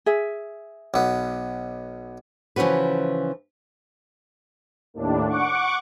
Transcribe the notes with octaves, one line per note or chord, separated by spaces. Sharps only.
G#4 E5
B1 B3
C#3 E3 F3 C#4 F#4 B4
D#2 A2 D4
F#5 C#6 D6